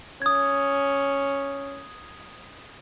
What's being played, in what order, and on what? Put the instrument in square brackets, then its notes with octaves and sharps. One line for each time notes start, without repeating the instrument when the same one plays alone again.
[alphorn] C#4 [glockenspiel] D#6 G#6